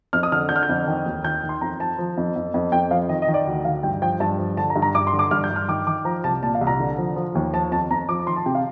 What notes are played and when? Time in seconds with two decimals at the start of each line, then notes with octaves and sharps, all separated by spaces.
0.13 F2 F6
0.23 D#6
0.32 D3 F6
0.49 D3 G6
0.56 F6
0.63 G6
0.69 F2
0.87 D#3
1.06 D#2
1.24 D#3 G6
1.43 D#3
1.49 C6
1.61 F2 A#5
1.80 F3 A5
1.99 F3
2.17 F2
2.36 F2
2.54 F2
2.72 F2 G5
2.91 F3 F5
3.09 D#3 D#5
3.22 D#5
3.28 D#3
3.34 D5
3.47 D2
3.65 D#3 F5
3.83 G2 G5
4.02 F3 G5
4.20 G2 A5
4.38 F3
4.57 D3 A5
4.70 A#5
4.76 G2
4.82 A#5
4.95 G2 D6
5.07 C6
5.13 D3
5.19 D6
5.31 G2 F6
5.44 G6
5.50 G2
5.56 F6
5.68 D#3 D6
5.87 D#3 D6
6.05 F3 A#5
6.24 C2 A5
6.42 A#2 A5
6.55 F5
6.61 C2
6.67 A#5
6.80 D3
6.98 F3
7.16 F3
7.35 D#2
7.53 F3 A5
7.72 F2 A5
7.91 F2 A#5
8.09 F3 D6
8.27 D#3 C6
8.36 A5
8.46 C3 G5
8.55 F5